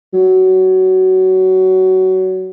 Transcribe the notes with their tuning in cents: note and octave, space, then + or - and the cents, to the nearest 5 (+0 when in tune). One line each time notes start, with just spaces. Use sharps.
F#3 +20